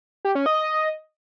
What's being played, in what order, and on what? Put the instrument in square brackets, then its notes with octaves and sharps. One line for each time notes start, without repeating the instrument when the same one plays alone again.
[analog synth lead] G4
C#4
D#5